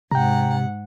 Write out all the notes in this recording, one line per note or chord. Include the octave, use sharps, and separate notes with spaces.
G#2 C3 F#5 G5 A#5